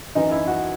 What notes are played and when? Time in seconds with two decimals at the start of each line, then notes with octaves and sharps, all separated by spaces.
0.15 F#2 E3 D#4
0.31 E4
0.47 F#4